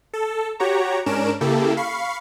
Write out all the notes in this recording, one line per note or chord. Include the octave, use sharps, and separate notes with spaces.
A4
F#4 G4 C#5 A#5
G#2 C#4 D4 A#4 D7 E7
C#3 A#3 E4 G4 A4
F5 B5 C#6 C7